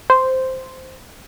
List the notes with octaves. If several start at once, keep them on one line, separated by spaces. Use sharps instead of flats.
C5